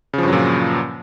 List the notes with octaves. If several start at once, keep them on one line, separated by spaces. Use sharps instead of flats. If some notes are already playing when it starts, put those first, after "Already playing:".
G2 A#2 C#3 F3 F#3